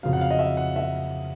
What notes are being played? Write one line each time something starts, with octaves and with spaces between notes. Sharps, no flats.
F2 C#3 F#3 F5
F#5
F5
D#5
E5
F#5
E5